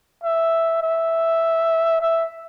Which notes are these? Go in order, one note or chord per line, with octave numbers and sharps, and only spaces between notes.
E5
E5
E5